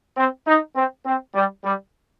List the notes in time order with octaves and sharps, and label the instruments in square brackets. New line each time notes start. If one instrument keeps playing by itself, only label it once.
[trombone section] C4
D#4
C4
C4
G3
G3